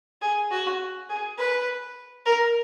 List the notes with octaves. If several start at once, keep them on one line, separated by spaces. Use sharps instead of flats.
G#4
F#4
G#4
B4
A#4